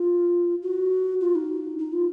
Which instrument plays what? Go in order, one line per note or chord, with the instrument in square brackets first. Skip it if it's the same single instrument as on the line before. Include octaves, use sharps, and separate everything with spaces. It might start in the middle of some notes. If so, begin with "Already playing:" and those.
Already playing: [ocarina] F4
F#4
F4
D#4
D#4
F4